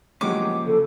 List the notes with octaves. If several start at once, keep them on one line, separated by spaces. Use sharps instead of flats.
F3 F#3 G#3 A#3 C#4 G4 D6
C#3 A4